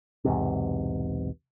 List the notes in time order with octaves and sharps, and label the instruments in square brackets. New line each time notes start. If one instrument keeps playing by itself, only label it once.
[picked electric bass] B1 E2 G#2 C3